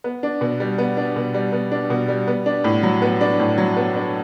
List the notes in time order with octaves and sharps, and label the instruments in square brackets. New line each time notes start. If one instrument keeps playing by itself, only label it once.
[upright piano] B3
D4
B2
G3
B3
D4
B2
G3
B3
D4
B2
G3
B3
D4
A2
F#3
B3
D4
A2
F#3
B3
D4